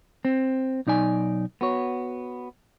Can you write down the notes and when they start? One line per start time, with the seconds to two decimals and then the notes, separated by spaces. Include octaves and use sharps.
0.25 C4
0.87 B1 D#4 D5 G#5
1.61 B3 F#4 C#5